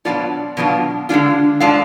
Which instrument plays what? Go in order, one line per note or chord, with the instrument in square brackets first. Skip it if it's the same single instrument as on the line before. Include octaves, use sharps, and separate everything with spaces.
[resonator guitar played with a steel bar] B2 F#3 B3 D4 F4 D5
B2 F#3 B3 D4 F4
D3 G#3 D4 F4
D3 G#3 D4 F4 F5